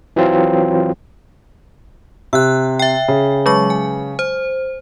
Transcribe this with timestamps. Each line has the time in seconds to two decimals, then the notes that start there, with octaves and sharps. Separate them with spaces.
0.16 E3 F#3 C4 F4
2.33 C3 E6 F#6
2.79 E5 G5
3.08 C#3
3.46 F#3 G#3 C#6
3.70 G#5
4.19 C5